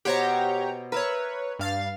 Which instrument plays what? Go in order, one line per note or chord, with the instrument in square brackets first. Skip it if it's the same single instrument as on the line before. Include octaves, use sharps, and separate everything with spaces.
[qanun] B2 C5 F#5 [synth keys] G4 C#5 A#5
[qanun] A#4 E5 [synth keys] B4 C#5
[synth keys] G2 F5 A6